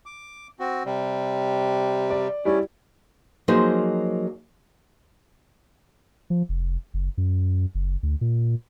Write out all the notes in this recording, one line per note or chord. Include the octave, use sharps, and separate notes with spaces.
D6
C4 F#4
C3 G3
D5
G3 C#4 E4 D5
F3 F#3 A#3 D#4 G#4 C5
F3
F1
F#1
F#2
F#1
D2
A#2